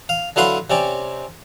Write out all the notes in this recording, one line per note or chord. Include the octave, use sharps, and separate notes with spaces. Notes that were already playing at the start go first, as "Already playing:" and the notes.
F5
D3 F#3 E4 B4 F5 C6
C3 C4 C#4 D5